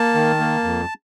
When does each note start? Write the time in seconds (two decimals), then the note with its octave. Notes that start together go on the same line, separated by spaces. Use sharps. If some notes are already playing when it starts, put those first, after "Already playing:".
Already playing: A#3 A5
0.15 D#3
0.39 A#3
0.64 F2